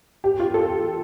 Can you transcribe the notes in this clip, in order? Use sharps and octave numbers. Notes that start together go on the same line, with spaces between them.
G4
F4
A4